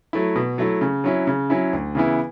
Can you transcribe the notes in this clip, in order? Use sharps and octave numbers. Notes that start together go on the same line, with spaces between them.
F#3 A3 E4
B2
F#3 A3 E4
C#3
F#3 C#4 E4
C#3
F#3 C#4 E4
D2
C#3 E3 B3 E4